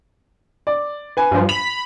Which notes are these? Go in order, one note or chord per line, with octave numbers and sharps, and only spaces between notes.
D5
B4 G#5
G2 F3
B5 F7